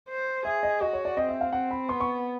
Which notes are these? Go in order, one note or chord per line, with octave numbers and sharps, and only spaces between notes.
C5
G#4 E5
D#5
F#4 D#5
C#5
D5
C4 D#5
E5
F5
C4 F#5
B5
B3 C6
C#6